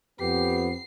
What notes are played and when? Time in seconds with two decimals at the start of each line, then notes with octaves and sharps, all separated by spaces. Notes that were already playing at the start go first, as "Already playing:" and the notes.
0.20 F2 B3 G4 C7